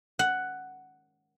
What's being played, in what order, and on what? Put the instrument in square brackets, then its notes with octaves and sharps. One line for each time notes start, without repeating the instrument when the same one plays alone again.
[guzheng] F#5